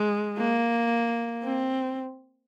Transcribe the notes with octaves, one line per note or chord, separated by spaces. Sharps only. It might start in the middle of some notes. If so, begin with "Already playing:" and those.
Already playing: G#3
A#3
C4